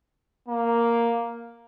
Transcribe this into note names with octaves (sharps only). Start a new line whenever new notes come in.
A#3